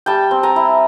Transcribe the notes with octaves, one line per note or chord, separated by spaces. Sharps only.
G3 G5 A5
C4
G#5 A#5
E4